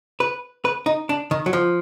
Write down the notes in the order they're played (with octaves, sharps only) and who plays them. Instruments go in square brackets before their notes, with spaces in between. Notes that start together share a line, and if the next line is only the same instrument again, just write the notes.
[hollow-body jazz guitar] B4
B4
D#4
D4
D#3
F#3
F3